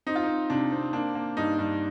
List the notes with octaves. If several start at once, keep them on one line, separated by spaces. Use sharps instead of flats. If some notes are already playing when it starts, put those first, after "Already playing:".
C4 D#4
F4
C4 D#4
C3 D4
C4
A#3 D4
A#3
G2 D#4
G2